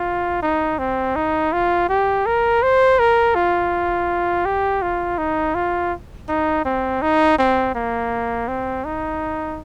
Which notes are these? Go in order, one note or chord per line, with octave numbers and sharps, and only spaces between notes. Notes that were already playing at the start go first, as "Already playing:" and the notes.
Already playing: F4
D#4
C4
D#4
F4
G4
A#4
C5
A#4
F4
G4
F4
D#4
F4
D#4
C4
D#4
C4
A#3
C4
D#4